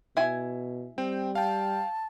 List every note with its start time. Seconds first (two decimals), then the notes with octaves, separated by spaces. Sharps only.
0.17 B2 E4 G#5
0.98 G3 C4 G5
1.35 F5 G5 A5